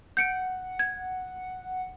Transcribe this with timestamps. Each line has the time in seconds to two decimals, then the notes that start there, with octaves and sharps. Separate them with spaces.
0.17 F#5 G6 C#7 D7
0.79 G#6